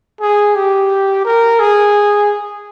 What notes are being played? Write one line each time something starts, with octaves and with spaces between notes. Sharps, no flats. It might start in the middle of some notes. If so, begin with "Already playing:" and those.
G#4
G4
A#4
G#4